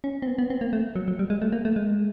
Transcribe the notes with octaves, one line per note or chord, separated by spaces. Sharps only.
C#4
C4
B3
B3
C4
A#3
A3
F#3
F#3
G3
G#3
A3
A#3
A3
G#3